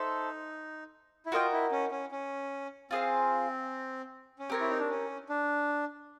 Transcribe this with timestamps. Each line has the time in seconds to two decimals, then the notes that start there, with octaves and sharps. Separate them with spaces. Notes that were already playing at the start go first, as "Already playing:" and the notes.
Already playing: D#4 A4 C5 E5
1.26 E4
1.32 F4 F#4 A#4 D#5 G5
1.52 E4
1.72 C#4
1.91 C#4
2.12 C#4
2.91 C4 F4 G#4 C5 F5
4.39 C#4
4.50 C4 G4 A#4 C#5
4.60 E4
4.70 D#4
4.80 D4
4.90 C#4
5.29 D4